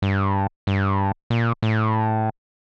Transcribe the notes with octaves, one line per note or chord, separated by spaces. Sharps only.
G2
G2
A#2
A2